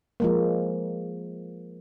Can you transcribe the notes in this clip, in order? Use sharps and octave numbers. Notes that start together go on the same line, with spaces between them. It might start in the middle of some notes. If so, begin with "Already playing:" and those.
F3 G#3 A#3